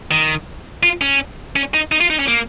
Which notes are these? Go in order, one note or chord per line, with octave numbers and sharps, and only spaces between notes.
D#3
F4
C#4
C#4
D#4
D#4
F4
D#4
C#4
A#3